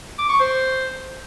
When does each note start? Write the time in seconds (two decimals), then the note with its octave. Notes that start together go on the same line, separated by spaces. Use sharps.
0.19 D6
0.29 C#6
0.40 C5